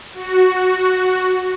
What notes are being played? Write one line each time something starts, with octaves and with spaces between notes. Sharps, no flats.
F#4